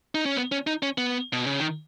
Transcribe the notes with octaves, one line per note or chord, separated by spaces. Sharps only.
D#4
C#4
B3
C#4
D#4
C#4
B3
B2
C#3
D#3